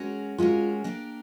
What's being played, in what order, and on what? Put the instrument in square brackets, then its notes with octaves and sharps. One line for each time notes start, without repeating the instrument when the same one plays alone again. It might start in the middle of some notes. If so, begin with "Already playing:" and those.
Already playing: [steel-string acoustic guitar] G#3 C#4 F#4 A#4
[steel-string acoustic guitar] G#3 C#4 F#4 A#4 [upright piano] F4
[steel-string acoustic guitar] A#3 D4 G4 A#4